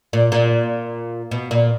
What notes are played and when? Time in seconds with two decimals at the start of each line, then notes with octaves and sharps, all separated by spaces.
0.13 A#2
0.32 A#2
1.31 B2
1.51 A#2